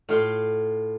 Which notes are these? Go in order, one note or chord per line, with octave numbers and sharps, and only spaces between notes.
A2 F4 F5 C6